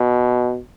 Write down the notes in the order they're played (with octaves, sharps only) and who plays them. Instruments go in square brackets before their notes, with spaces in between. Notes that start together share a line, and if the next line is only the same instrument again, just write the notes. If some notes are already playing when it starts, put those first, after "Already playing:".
Already playing: [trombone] B2